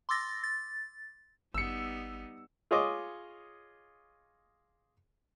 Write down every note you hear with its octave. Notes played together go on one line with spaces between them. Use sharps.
C6 D6 E6 A6 A#6
A6
G#1 G3 B3 D#4 E6 C#7
F4 G#4 C#5 D#5 D6